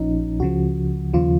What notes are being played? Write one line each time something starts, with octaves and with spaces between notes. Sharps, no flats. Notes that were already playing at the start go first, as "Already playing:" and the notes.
Already playing: A#1 A#2 F3 C#4 D#4
C#2 C#3 F3 F#4
D#2 C#3 F3 F4